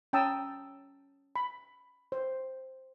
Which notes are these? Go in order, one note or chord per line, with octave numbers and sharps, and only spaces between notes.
C#4 G5 A5 A#5 D#6 E6
B5
C5